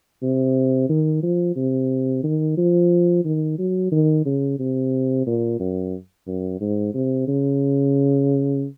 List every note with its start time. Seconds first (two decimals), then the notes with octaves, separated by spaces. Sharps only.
0.22 C3
0.89 D#3
1.23 F3
1.56 C3
2.24 D#3
2.57 F3
3.25 D#3
3.58 F#3
3.92 D#3
4.25 C#3
4.59 C3
5.27 A#2
5.60 F#2
6.27 F#2
6.61 G#2
6.94 C3
7.28 C#3